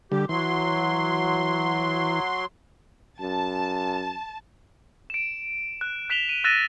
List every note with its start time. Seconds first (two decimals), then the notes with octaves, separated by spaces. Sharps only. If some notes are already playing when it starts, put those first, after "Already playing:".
0.12 D3 G3 G4
0.29 E3 F#3 C6
3.21 F#2 A5
5.10 D7 E7
5.81 F#6
6.10 F#6 B6 E7 F7 G7
6.29 D#7
6.44 E6 F#6 A6 A#6 D#7 E7